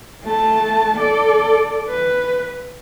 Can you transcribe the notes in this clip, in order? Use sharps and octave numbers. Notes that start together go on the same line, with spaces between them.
A3 A5
A4 D5
B4